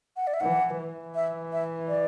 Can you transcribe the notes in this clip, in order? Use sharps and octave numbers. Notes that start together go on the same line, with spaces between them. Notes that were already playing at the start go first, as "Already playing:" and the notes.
F#5
D5
E5
E3 F#5
E3
E5
E5
D5